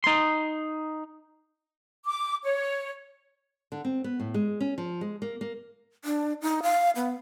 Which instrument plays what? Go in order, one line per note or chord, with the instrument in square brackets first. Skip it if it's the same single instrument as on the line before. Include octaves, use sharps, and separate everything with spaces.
[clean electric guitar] D#4 C6
[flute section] D6
C#5
[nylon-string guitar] D3
C4
B3
A2
G#3
C#4
F3
G#3
A#3
A#3
[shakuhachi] D4
D#4
F5
B3